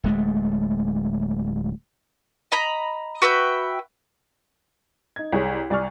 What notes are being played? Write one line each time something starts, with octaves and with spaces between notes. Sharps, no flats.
D1 G#3 A3
D#5 A#5 B5
F#4 B4 E5 G5
D#4 G#6
C2 G#4 C#5
C2 D5 G#5 C#6 F6